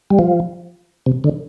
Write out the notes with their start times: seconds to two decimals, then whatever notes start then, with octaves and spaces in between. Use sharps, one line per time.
0.10 G3
0.19 F3
1.06 C3
1.24 D3